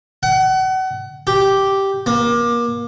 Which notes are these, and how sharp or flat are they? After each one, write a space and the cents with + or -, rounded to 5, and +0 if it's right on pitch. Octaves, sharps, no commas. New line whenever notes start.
F#5 +30
G4 -5
A#3 +30